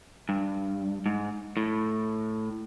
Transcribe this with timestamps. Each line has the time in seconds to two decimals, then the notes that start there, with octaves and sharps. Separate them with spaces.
0.29 G2
1.06 G#2
1.57 A2